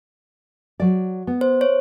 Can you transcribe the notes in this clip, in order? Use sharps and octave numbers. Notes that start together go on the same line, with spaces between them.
F#3 D5
B3
C5
C#5